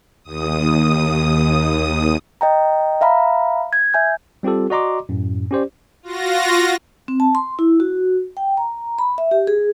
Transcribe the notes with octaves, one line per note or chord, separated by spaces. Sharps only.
D#2 D#6
D#5 G5 A#5
E5 F5 A#5 B5
G#6
E5 G#5 G6
G3 C4 F4 G4 A4
F#4 D5 D#5 A#5 C6 D6
F#2 A2
C#4 G4 C5 D5
F4 F#4 A#6
C4
A5
C6
E4
F#4
G5
A#5
B5
E5
G4
G#4